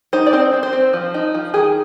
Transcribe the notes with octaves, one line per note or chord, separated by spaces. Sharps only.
D#4 C5
D5
C4 C5
C4
C5
C4
F3
D#4
F3
D#3 G#4